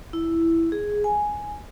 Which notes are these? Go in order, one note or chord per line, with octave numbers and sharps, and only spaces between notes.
E4
G#4
G#5